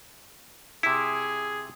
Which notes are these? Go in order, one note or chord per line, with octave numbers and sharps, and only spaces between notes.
C3 E4 G#4